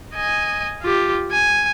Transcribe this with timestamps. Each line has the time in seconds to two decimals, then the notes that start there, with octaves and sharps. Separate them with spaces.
0.14 D#5 G#5
0.82 F4 G4
1.32 G#5